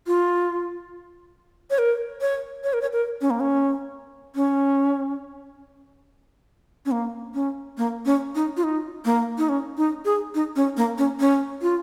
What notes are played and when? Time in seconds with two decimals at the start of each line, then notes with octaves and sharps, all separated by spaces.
0.07 F4
1.70 C#5
1.78 A#4
2.21 C#5
2.64 C#5
2.73 A#4
2.82 C#5
2.93 A#4
3.21 C#4
3.30 A#3
3.40 C#4
4.36 C#4
6.86 C#4
6.91 A#3
7.34 C#4
7.78 A#3
8.06 C#4
8.35 D#4
8.57 F4
8.64 D#4
9.05 A#3
9.38 D#4
9.49 C#4
9.77 D#4
10.05 G#4
10.35 D#4
10.56 C#4
10.77 A#3
10.98 C#4
11.20 C#4
11.62 F4